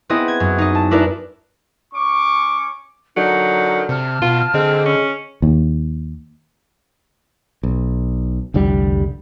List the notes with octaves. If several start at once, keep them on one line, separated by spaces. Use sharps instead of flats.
B3 C4 E4 G#4 D#5
G#6
F#2
D#4 D#5
A5
D4 E4 A#4 B4 D5
C#4 C#6 D6
D3 F#3 D#4 A#4
C3 A5 F6
B2 F4
D3 G#3 C4
C#4
D#2
B1
F1 C2 D3 G3